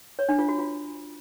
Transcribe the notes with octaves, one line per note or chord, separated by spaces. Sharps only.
C#5
D4
F4
F#4
F4